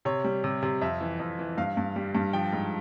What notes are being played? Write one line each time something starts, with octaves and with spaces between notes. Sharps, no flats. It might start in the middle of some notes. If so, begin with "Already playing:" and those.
C3 C#5
G3
C3
C3
F2 E5
E3
F2
E3
G2 F5
G2
G3
G2
F3 G5
G#2